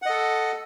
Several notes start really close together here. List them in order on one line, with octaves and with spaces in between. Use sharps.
F#5 D#5 A4